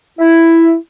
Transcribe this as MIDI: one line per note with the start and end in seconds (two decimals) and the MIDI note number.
0.19 0.74 64